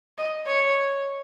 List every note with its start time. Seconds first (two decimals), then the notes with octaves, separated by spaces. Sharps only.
0.18 D#5
0.47 C#5